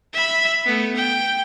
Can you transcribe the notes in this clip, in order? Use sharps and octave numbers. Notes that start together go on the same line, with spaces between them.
E5 B5
A3 B3
G5